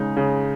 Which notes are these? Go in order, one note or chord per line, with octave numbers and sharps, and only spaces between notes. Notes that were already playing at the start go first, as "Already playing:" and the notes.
Already playing: C#3 G#3 D#4
C#3